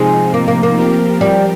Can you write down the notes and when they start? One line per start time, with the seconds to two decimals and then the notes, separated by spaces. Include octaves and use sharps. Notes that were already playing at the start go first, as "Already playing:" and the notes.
Already playing: C3 F3 G#3 C4 D#4
0.34 A#3
0.48 A#3
0.63 A#3
0.77 F3 C4 G4 A#4
1.21 G3